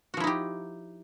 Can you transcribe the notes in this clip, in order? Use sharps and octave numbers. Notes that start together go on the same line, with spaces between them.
F3 D#4 E4 F#4 G4